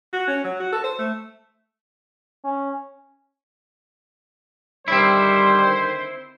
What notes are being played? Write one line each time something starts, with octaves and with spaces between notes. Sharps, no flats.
F#4
C#4
F#3
F#4
A4
C5
A3
C#4
D3 D#3 G3 C4 E4 C5